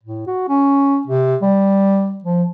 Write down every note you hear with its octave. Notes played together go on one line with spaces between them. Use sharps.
A2
F#4
C#4
C3
G3
F3